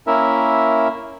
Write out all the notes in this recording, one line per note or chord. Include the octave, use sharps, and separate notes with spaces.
A#3 C#4 E4 A#4 E5